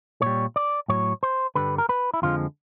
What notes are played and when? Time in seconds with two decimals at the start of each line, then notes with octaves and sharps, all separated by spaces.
0.22 A#2 G3 C#5
0.56 D5
0.88 A2 F#3 C#5
1.23 C5
1.55 G2 D3 G3 B4
1.78 A#4
1.89 B4
2.14 E4
2.22 F2 D3 F3 G#3 F4